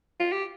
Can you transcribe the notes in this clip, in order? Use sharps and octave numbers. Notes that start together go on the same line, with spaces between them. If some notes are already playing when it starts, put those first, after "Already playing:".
F4
G4